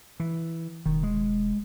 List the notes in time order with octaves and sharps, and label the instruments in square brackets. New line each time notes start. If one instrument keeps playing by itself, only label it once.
[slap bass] E3
[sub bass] E1 [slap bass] D#3
[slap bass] G#3